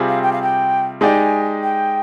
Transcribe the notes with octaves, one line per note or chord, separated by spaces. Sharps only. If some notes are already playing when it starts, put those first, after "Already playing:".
Already playing: C3 G3 C4 F4 G#4
F5
G5
F5
G5
G#3 D#4 G4 D5 G#5
G5